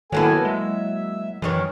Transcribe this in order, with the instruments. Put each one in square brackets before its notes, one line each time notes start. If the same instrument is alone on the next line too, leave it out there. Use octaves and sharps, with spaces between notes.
[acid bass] D#3 [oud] F#3 A#3 E4 [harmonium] B3 A4 G#5
[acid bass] G#3 [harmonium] E5
[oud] F#2 D#3 C#4 [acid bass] E3